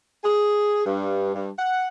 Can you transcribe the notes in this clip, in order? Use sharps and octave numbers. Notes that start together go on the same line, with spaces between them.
G#4
G2
G2
F#5